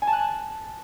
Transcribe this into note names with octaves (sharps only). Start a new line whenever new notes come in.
G#5
A5
F#6